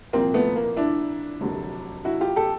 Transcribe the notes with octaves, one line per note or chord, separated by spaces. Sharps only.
C2 A#2 F3 A#3 C4
A3 B3
A#3
D4 E4
F1 D#2 D3 F#3
E4 F#4
F4 G4
G4 A4